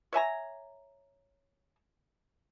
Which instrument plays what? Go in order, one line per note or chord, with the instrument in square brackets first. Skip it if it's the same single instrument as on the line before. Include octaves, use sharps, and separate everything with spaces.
[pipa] C#5 E5 G#5 A#5